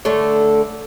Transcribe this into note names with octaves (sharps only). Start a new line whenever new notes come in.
D3 A3 C#5